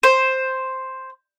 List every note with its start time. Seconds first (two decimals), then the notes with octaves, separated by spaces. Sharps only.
0.03 C5